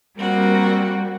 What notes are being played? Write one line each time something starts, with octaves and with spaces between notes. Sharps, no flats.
G3 A#3 C4 F#4